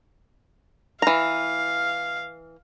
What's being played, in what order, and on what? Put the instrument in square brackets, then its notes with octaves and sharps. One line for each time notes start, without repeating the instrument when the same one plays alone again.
[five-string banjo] E3 A#5 [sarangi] F5